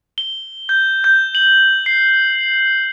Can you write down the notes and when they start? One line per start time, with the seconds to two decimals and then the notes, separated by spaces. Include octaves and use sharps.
0.18 G7
0.69 G6
1.04 G6
1.35 F#7
1.86 C7